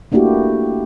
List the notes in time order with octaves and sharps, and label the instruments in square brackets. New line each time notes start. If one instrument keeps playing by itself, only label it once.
[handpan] A3 A#3 D4 E4 F#4 G4